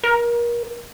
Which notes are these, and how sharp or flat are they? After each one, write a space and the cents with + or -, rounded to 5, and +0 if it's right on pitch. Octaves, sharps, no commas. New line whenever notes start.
A#4 +30